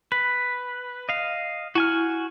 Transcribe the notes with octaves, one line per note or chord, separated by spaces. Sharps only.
B4 B6
D#5 F5
E4 F#4 G#5 F6